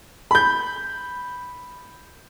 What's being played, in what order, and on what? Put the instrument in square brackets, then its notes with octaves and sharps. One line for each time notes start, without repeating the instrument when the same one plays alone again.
[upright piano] B5 G6